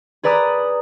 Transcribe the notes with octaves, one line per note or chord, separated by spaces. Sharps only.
G#4 B4 D5 A#5 D#6 F#6